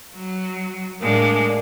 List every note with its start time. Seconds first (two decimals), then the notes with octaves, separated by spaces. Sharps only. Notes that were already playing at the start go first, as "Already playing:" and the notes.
0.16 F#3
1.01 A2 G#3 A#3 D4